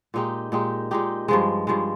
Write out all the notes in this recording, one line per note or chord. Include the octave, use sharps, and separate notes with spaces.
A#2 G#3 D#4 G4
A#2 G#3 D#4 G4
A#2 G#3 D#4 G4
G2 F3 G#3
G2 F3 G#3